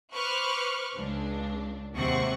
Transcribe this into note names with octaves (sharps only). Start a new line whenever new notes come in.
B4 C5 C#6 D6 F6 F#6
C#2 D4
D#2 G#2 C3 E3 F#5 C#6